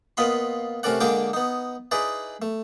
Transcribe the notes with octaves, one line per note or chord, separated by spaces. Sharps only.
A#2 B3 F4 D#5 B5 C6
C3 A3 C#4 A#4 D5 F#5
D3 G#3 A#3 D4 G5 D6
B3 D#4
D#4 E4 G#4 B4 D5
A3